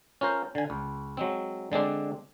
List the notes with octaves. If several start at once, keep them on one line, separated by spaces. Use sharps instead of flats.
C#4 F4 A#4 C5
D3 G#5
C#2
F#3 G#3 C4
D3 G#3 C4 D4